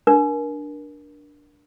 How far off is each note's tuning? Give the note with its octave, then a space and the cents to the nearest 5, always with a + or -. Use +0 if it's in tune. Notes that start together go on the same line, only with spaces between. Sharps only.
D4 +0 A#4 +25